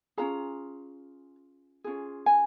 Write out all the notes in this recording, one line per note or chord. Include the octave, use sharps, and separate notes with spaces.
C#4 F4 G#4 A#5
C#4 F4 G#4
G#5